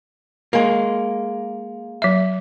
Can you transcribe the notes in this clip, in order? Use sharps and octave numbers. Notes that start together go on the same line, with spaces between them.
G#3 A#3
F#3 E5